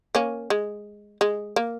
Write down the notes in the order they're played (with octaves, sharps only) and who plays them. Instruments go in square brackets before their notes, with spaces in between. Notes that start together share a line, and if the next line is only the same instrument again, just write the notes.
[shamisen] A#3 C#4
G#3
G#3
A#3